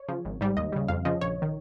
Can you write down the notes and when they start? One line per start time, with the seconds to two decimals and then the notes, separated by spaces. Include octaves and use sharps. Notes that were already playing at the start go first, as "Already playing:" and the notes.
Already playing: C#5
0.08 C#3 F3
0.25 G#1
0.41 G#2 G3
0.57 D#2 D#5
0.72 C#3 G3
0.88 F2 F5
1.05 C#3 F3 D#5
1.21 A#1 C#5
1.42 D#3